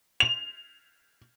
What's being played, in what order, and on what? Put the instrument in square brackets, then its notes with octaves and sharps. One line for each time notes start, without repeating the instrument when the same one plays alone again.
[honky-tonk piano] F7